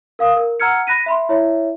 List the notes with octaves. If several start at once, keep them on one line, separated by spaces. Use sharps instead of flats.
A#4 F5 D#6
A#4
F#5 A#5 E6 F6 G#6 C#7
B5 F#6 A#6 B6 D#7
E5 B5 C6
E4 C#5 E5